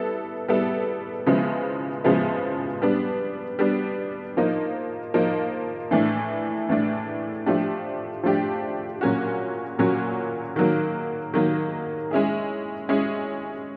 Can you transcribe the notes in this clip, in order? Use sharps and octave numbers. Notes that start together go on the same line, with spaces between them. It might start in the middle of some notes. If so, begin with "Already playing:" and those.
Already playing: G3 B3 E4 A4
G3 B3 E4 A4
C#3 F3 G#3 B3 E4
C#3 F3 G#3 B3 E4
G3 B3 D4
G3 B3 D4
F3 A#3 D#4
F3 A#3 D#4
A2 E3 A3 D4
A2 E3 A3 D4
F3 A3 D4 G4
F3 A3 D4 G4
A#2 F#3 A#3 C#4 F#4
A#2 F#3 A#3 C#4 F#4
D#3 F#3 A#3
D#3 F#3 A#3
G#3 C#4 E4 G#4
G#3 C#4 E4 G#4